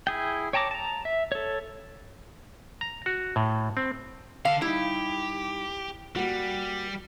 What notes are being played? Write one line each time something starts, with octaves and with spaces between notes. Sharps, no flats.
E4 G#4 G5
C#5 G5 A5 A#5 D6
A5 A#5
E5
A4 C#5
A#5
F#4
A2
C4
D3 A4 F5
G3 D#4 E4 G4
G3 A#3 F#4